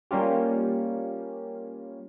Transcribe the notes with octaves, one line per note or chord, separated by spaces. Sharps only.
G3 A#3 C#4 F4 G4